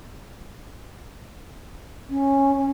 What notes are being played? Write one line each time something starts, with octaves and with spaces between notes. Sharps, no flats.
C#4